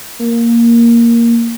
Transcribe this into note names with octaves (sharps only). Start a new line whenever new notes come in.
A#3